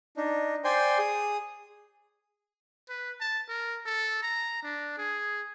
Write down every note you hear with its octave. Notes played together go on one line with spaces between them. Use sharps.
D4 D#4
C5 D5 G5 G#5 C6
G#4 D#6
B4
A5
A#4
A4
A#5
D4
G#4